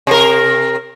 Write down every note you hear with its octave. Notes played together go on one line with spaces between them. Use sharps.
C3 A#4